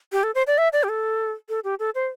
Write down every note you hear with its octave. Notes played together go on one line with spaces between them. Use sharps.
G4
A4
C5
D5
E5
D5
G4
A4
A4
G4
A4
C5